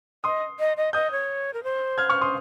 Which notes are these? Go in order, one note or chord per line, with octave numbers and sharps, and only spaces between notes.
D#5 C6 D#6
D#5
D#5
D#5 D#6 G6
C#5
A#4
C5
F6 G#6
C#6 F6
C6 D#6